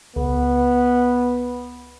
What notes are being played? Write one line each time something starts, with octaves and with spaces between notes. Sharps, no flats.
C#2 B3